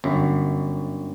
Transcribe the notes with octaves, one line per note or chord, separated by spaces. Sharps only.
G1 F#2